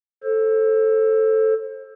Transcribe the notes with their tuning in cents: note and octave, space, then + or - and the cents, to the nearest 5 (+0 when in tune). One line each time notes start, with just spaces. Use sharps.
A4 +0 C5 +30